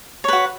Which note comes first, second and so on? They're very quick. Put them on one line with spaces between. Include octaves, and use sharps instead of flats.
C#5 B4 F#4